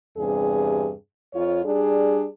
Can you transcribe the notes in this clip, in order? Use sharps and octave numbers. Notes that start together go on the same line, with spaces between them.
E2 G2 C3 G#4
F2 F4 C#5
G3 D4 G#4